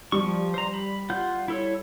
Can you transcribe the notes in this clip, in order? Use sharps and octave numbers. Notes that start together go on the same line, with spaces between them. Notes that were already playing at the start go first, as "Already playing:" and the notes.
F3 G3 C#6
C5 A#5
B5
F4 F#5 G6
E4 A4 C#5